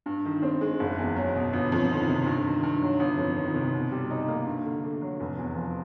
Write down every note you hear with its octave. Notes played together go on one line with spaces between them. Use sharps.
G2
D#3
C4
G#3
F#1
E2
F#3
B2
G1
F2
D#3
C3
G2
D#3
G2
F#3
G1
F2
D#3
C3
B2
G3
D#4
A#3
G2
D3
A3
F#3
F1
E2
F3